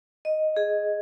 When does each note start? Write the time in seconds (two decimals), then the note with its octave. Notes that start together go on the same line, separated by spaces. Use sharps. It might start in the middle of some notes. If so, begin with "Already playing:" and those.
0.25 D#5
0.57 G#4